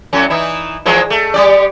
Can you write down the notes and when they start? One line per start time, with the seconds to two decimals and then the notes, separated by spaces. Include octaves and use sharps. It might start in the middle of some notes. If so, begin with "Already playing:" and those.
0.13 A2 F#3 C#4
0.30 E3 D#4 E4
0.86 E3 F3 G#3
1.10 A3
1.34 G3 G4 D5